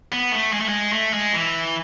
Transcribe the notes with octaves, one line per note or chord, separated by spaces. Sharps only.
B3
A3
G#3
A3
G#3
A3
G#3
E3